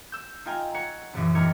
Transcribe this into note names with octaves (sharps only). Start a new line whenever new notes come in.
E6 G6
D#4 F4 F5 G5 G#5 A#5
C#5 F#5 A#5 C#7
A#1 F#2 A#2 E3
E2 G3 D#4 A#4 G#6 C#7